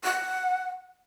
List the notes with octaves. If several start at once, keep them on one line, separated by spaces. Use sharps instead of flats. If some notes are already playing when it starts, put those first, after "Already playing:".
F#5